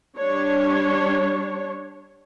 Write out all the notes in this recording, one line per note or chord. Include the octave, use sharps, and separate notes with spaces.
G3 D4 C#5